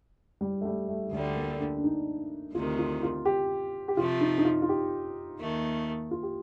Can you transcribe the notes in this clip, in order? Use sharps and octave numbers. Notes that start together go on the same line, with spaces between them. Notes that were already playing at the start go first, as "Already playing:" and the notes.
G3
A3
G3
A3
D2 D3 G3 A3
A3
A#3
D4
D4
D#4
D2 C3 D#3 F4
F4
F4
G4
G4
C3 F3 A3 F4
D#4
D#4
F4
F4
G4
D#2 D#3 A3
F4
G4